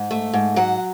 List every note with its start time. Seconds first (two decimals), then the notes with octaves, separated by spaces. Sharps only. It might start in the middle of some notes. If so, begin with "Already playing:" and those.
Already playing: G#2
0.11 A3
0.33 G#2
0.56 F#3 F#5